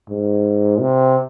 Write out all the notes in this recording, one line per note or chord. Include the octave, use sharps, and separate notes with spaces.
G#2
C3